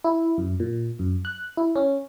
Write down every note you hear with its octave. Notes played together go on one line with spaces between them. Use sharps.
E4
F#2
A#2
F#2
F#6
E4
C#4